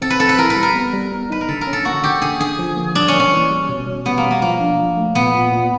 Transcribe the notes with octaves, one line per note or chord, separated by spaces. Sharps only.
C4 A4
B4
C4 A4
B4
E4 A#4
B4
G3
A#4
B3
G3
B3
D#4 B4
A#4
D3 A4
A#4
C#4
A4
A#3 F#4
D3 G4
D3 G#4
D3 G#4
F3
A#3
G3 D4
C#4
A#3
C#4
E3
G3
B2
B2
G3 B3
A#3
B2
A#3
F3 A#3
D4
F3
A3
A#2 B3
A#2
A#2